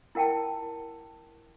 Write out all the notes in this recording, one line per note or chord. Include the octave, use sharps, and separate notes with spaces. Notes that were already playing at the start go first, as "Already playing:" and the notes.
E4 A#4 F#5 G5 A5